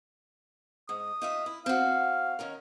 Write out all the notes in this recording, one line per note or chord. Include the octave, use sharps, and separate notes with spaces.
G#2 D#6
D#4 F4 E5
E4
C4 F#4 F5
D#3 C#4 A#4